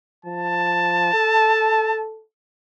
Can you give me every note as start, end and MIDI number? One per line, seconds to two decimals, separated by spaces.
0.25 1.11 53
0.25 2.03 81
1.13 2.22 69